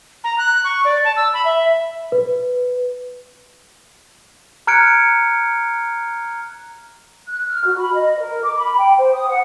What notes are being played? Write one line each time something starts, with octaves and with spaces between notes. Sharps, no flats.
A#5
F#6
C#6
D5
A5
E6
B5
E5
B4
A#5 F6 F#6 G#6 C#7 D7
F#6
F6
F#4
B5
D#5
A#4
D6
B5
G5
C5
D#6
F#5